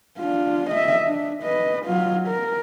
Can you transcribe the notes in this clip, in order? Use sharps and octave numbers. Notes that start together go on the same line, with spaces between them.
D4 F4
D#5 E5
D4
B4 D#5
F#3 F4
A#4